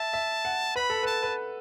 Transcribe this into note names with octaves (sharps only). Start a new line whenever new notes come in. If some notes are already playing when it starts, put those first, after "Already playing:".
Already playing: E5 A5
E5
F#5
B4 B5
A4
B4 A5
B4